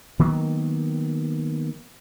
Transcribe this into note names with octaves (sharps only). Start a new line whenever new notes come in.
D#3 F#3 A#3 B3